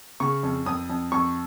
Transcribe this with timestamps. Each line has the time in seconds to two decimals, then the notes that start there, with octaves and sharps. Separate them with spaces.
0.20 C#3 C#6
0.43 F2
0.66 F2 D#6
0.89 F2
1.12 F2 C#6